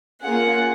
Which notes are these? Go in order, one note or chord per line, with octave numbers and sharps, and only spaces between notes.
A#3 C#4 F4 G#4 F#5